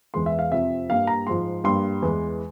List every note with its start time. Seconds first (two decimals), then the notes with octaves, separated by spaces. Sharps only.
0.14 E2 E3 G#3 C6
0.26 E5
0.39 F5
0.52 F2 C3 F3 E5
0.90 G2 G3 A#3 F5
1.07 A#5
1.27 G#2 F3 G#3 C6
1.64 G2 G3 A#3 C6
2.02 E2 E3 G#3